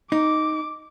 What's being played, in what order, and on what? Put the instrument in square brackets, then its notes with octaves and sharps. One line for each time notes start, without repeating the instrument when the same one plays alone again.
[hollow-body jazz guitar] D#4 [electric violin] D6